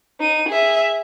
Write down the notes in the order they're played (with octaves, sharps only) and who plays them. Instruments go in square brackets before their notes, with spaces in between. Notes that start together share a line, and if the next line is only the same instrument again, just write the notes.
[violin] D#4 D#7
G#4 E5